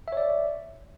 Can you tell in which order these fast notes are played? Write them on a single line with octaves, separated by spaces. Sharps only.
E5 C#5 D5